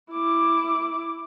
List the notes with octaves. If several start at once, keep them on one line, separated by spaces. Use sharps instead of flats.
E4 D6